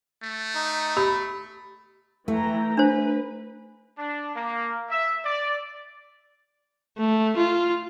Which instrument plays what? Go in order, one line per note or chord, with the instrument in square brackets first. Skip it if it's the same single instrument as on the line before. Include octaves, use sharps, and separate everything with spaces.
[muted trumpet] A3
[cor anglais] D#4
[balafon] G4 [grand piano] B5
[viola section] E3 G5 A#5 [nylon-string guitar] A3
[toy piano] D4 C5 [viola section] B4
[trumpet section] D4
A#3
E5
D5
[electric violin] A3
F4